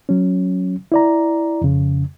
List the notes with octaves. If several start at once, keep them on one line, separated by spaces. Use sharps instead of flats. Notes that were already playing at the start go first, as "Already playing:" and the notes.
F#3 C#4
E4 D5 A#5
F2 C#3